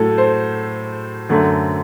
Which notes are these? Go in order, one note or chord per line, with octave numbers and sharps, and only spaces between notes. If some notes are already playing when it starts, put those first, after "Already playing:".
Already playing: A2 F#3 A3 A4
C5
F#2 D3 A3